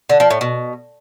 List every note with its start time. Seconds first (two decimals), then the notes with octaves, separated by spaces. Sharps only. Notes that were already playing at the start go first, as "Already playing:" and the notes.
0.09 D3
0.20 F3
0.30 A2
0.41 B2